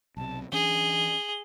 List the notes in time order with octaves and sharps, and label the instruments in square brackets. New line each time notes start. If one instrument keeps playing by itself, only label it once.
[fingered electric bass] B1 C3 [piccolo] A5
[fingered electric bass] E3 C#4 D4 [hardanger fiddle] G#4 [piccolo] G7